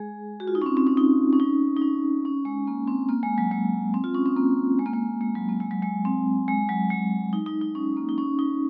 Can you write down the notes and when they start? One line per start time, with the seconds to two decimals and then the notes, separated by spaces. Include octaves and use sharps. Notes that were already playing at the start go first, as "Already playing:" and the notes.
Already playing: G#3 G#4
0.40 F#4
0.47 F4
0.55 D#4
0.62 C#4
0.66 C4
0.77 C4
0.87 C#4
0.97 D#4
1.33 C#4
1.40 D#4
1.77 D#4
1.82 C#4
2.25 C#4
2.45 G#3
2.67 A#3
2.87 C4
3.09 A#3
3.23 G#3
3.38 F#3
3.51 G#3
3.94 C4
4.04 F4
4.14 C#4
4.26 C4
4.36 A#3
4.79 G#3
4.86 A#3
4.93 G#3
5.21 G#3
5.35 F#3
5.49 A#3
5.60 G#3
5.71 F#3
5.83 G#3
6.05 C4
6.48 G#3
6.69 F#3
6.90 G#3
7.33 D#4
7.46 D#4
7.61 D#4
7.75 C#4
7.97 A#3
8.09 D#4
8.18 C#4
8.39 D#4